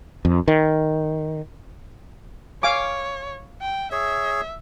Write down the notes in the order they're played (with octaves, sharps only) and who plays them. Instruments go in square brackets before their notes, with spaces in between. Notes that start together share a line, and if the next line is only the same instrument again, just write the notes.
[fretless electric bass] F2
D#3
[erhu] C#5 [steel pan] F5 G#5 D6
[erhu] G5
[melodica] G#4 C#5 [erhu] E5